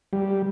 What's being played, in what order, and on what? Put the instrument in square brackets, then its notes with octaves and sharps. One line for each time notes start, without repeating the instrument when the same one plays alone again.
[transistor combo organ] G3